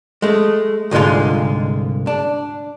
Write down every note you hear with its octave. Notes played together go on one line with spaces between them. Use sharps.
G#3 A3
C2 G#2 D3 G#3 F4
D4